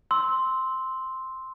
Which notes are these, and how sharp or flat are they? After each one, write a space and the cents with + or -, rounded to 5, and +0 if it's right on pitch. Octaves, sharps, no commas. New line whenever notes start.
C6 +0 E6 -20